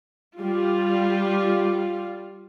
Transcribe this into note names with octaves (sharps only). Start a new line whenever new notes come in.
G3 F4